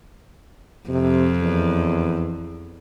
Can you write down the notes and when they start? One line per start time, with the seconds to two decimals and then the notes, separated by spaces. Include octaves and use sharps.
0.89 F2 C3
1.41 E2